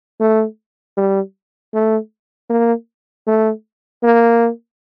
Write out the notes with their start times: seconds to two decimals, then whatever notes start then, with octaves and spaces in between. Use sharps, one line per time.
0.20 A3
0.97 G3
1.74 A3
2.50 A#3
3.27 A3
4.03 A#3